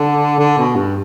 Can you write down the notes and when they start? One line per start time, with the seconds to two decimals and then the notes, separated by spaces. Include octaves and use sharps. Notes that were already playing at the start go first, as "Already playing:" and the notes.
Already playing: D3
0.39 D3
0.58 B2
0.76 G2